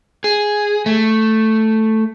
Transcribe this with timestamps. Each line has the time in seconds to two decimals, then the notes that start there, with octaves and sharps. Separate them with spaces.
0.24 G#4
0.86 A3